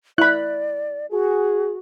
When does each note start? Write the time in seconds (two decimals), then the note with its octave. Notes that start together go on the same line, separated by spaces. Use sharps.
0.18 E4 D5 B5 F#6
1.11 F#4 G#4